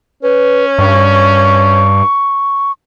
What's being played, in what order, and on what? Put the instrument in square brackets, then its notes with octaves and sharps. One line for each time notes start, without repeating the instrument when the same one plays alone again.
[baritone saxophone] C#4 [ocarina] B4
[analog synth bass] G2 [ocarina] C#6